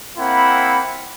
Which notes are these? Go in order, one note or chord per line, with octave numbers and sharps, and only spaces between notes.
A#3 C4 E4 F#5 B5